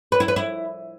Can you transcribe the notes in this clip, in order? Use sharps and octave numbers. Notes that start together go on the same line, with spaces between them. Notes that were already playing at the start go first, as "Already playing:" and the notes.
B4
E4
B4
E4